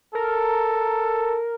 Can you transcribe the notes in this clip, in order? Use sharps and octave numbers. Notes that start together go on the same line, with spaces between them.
A4 A#4